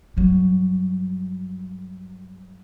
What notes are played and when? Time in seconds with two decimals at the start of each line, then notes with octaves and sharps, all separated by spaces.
0.17 G2 F#3